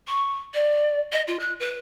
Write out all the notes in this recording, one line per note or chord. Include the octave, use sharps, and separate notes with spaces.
C#6
D5
D#5
F4
F#6
B4